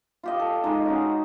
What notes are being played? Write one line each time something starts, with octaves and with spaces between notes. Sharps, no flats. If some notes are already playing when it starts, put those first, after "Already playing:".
F4 G4 D#5
A4
G#3 D#4
C#4 F#4